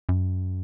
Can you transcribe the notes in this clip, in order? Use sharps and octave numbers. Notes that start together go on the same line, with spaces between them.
F#2